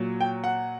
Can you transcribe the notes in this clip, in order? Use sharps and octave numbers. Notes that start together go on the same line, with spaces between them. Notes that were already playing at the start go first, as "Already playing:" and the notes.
Already playing: A#2 F#3
G5
F#5